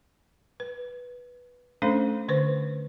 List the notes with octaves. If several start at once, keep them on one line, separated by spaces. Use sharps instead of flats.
B4
A3 C#4 D4 A4 C5 F5
D3 B4 C5 C#6